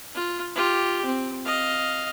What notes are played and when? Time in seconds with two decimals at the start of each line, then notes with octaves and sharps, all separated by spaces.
0.15 F4
0.56 F4 G4
1.05 C4
1.46 D#5 F5